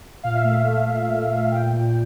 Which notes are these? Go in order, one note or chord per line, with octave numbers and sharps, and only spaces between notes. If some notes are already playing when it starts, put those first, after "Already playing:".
A#2 F5
E5
A3 F5
A3
A#2
A#2
A#2
A#2 G5
A#2